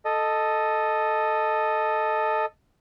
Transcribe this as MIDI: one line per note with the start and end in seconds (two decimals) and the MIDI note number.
0.05 2.45 69
0.05 2.45 75